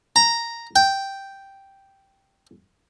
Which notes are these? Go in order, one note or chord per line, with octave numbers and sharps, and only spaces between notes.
A#5
G5